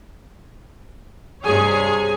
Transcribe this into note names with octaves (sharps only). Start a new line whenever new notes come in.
G2 C3 G#4 C#5 G#5